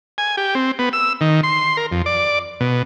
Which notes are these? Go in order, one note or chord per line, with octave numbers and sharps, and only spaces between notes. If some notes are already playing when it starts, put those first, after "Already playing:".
G#5
G4
C4
B3
E6
D#3
C6
A#4
F2
D5
B2